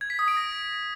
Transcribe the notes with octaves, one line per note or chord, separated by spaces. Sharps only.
G#6
B6
D#6
D7
A#6